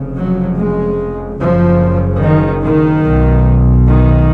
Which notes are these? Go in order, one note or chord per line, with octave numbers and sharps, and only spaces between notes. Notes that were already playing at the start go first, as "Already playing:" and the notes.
Already playing: F1 F2 C#3
F#3
G#3
F#1 F#2 C#3 F3
D#3
D#3
B1 B2
D#3